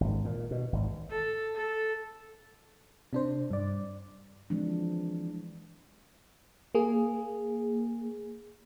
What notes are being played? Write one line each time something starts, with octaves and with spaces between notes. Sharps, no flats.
G#1
A#2
B2
G#1
A4
A4
C3 D4 C5
G2 D5
E3 F3 G#3 C4 D4
A#3 G#4